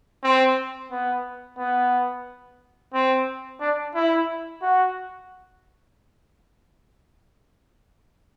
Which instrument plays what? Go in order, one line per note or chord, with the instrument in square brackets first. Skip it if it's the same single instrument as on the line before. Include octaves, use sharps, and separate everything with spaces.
[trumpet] C4
B3
B3
C4
D4
E4
F#4